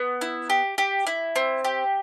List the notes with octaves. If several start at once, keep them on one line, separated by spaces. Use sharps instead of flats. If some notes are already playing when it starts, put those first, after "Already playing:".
Already playing: B3
E4
G4
G4
E4
C4
G4